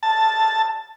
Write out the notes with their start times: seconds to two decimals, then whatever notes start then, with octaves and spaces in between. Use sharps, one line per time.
0.03 A5